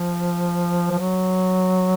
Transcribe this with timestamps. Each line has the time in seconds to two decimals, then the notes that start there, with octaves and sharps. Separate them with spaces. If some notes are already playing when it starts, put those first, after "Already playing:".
Already playing: F3
0.91 F3
0.99 F#3